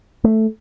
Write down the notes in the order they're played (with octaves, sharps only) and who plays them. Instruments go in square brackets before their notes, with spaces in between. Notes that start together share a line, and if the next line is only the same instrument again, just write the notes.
[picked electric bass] A3